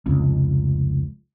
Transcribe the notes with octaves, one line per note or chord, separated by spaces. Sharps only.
F1 C#2